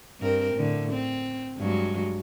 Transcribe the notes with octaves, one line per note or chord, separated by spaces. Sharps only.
G2 C4 A#4
A2 D3
C4
G2 F#3 G#3